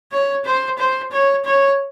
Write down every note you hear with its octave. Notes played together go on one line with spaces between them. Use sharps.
C#5
C5
C5
C#5
C#5